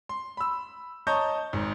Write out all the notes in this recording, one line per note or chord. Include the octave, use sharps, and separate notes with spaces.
C6
B5 E6
C#5 D#5 A5 A#5 C#6 G6
G#1 G#2